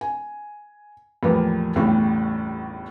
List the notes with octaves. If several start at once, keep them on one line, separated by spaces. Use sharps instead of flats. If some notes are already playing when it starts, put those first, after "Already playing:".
G#5
E2 A2 F3 G3 A#3 B3
G1 E2 A2 C#3 G3